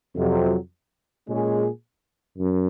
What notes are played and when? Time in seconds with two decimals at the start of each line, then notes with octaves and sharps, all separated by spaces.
0.16 F2 C3 F#3
1.27 A#2 G#3 C#4 G#4
2.38 F#2